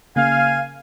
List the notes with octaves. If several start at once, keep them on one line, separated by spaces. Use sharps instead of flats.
C#3 A#3 F5 G#5